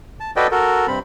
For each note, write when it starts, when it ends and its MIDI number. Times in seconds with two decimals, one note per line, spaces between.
0.20 0.31 81
0.36 0.47 66
0.36 0.47 69
0.36 0.47 71
0.36 0.47 74
0.36 0.47 75
0.36 0.47 79
0.51 0.87 66
0.51 0.87 69
0.51 0.87 70
0.88 0.99 43
0.88 0.99 48
0.88 0.99 60
0.88 0.99 83